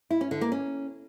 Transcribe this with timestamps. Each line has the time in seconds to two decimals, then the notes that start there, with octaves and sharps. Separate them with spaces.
0.10 E4
0.21 C#4
0.31 D3
0.41 A#3
0.52 C#4